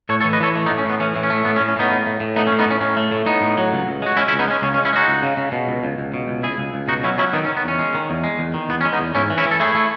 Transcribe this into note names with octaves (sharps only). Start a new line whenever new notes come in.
A2 A4 C#5
A4 C#5
E3
B4 D#5
E3 A4 C#5
A3
B3 D#4
A2
C#4
A2 B3
E3 C#4
A2
C#4
A3
A2 B3
C#4
A2
C#4
A2 B3 D#4
A2
A2
A2
A3 B3 D#4
C#4
A2
B3 D#4
A2 C#4
A2 C#4
A3
A2
A2 B3 D#4
A2
F#3
C#2
C#2
G#3 F#4
G#3 C#4 E4
C#4 E4
C#2
B3 D#4
G#3 C#4
C#2 C#4
C#4
G#3
C#4 E4
G#3 D#4 F#4
C#2
C#3
C#3
B2
C#2
C#2
C#2
B2
C#2
C#2 E4 G#4
C#2
C#2
B2 D#4 F#4
F#3 C#4 E4
F#3 C#4 E4
D#3 B3 D#4
C#4
D#3
B3
E2 C#4
G#3
D#3
E2
G#3
E2
D#3
E2 B3
C#4
G#3
B3 D#4
E2
G#2 C#4 E4
E3
C#4 E4
E3
A4
A3 E4 G#4
A3